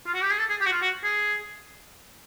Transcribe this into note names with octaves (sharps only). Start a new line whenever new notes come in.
F4
F#4
G4
G#4
A4
G#4
G4
F#4
F4
F#4
G#4